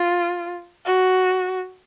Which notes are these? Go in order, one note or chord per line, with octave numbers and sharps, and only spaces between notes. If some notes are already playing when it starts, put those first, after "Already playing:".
Already playing: F4
F#4